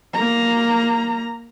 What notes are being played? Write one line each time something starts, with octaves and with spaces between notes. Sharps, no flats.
A#3 A#5